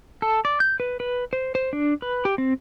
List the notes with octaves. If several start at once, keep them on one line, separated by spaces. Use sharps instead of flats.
A4
D5
G6
B4
B4
C5
C5
D4
B4
G4
C4